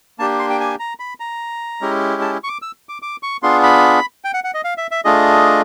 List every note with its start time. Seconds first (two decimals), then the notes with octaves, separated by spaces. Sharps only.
0.19 A#3 D4 G4 A5
0.39 C6
0.50 G5
0.60 G#5
0.79 A#5
1.00 B5
1.20 A#5
1.81 G#3 C#4 E4 G4
2.22 A5
2.44 C#6
2.48 D6
2.62 E6
2.89 D6
3.02 D6
3.23 C#6
3.43 B3 D4 F4 G#4 C6
3.63 B5
4.24 G5
4.34 F#5
4.44 F#5
4.54 D#5
4.64 F5
4.78 E5
4.91 E5
5.05 A3 D4 F4 G#4 D#5